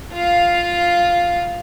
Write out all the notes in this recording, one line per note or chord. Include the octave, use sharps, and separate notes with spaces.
F4 F5